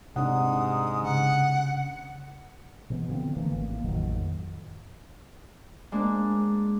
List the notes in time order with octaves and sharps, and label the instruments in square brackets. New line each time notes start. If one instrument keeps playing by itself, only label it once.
[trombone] G#2 [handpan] C3 D4 [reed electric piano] F#5 [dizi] D#6
[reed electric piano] C#3 [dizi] F#5
[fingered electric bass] B2 E3 B3
D3 F3 C4
E3 A3 A#3
G#1 A#3
A1 F2 D#3 F#3
[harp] G#3 A#3 D4